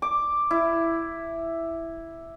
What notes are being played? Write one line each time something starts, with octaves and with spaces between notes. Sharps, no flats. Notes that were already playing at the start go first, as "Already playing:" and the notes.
D6
E4